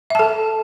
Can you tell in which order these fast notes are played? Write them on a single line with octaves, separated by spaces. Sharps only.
E5 A5 A4